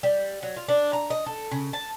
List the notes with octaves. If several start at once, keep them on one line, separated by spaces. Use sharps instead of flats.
G3
F#3
F4
D4
A#5
D#5
A4
C#3
A5